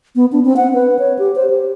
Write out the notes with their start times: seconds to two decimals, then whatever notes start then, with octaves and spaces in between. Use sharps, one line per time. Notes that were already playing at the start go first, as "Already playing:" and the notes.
0.16 B3
0.32 D4
0.45 C4
0.57 F#5
0.74 B4
0.99 C#5
1.19 G4
1.36 C5
1.50 G4